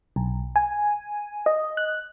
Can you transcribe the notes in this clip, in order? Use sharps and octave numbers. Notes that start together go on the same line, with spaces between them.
B1
G#5
D#5
F#6